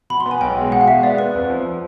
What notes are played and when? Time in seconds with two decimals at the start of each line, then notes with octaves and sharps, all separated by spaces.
0.10 B2 B5
0.20 C6
0.26 B3
0.31 G#5
0.41 B1 G5
0.57 G#3
0.72 B2 F#5
0.81 F5
0.88 G#3 E5
1.03 B3 D5
1.18 B3 B4
1.35 F2
1.50 F3
1.65 F3